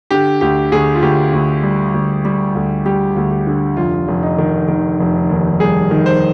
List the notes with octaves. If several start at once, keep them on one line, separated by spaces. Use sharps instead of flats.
D3 G4
D2 G4
D2 G#4
F4
D2 G4
D2
G3
D2
G3
D2
G3 G4
D2
G4
D3
F1 F4
F1
D#4
D#3
D#3
F1
D#2
G3 G#4
D#3
C5